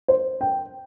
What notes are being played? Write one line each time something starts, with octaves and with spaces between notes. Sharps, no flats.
C5
G5